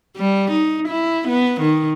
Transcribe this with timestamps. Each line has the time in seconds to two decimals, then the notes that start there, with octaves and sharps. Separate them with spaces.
0.17 G3
0.51 D#4
0.88 E4
1.28 B3
1.61 D#3